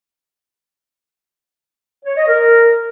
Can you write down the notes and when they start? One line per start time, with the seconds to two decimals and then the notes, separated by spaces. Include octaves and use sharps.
2.05 C#5
2.17 D#5
2.28 A#4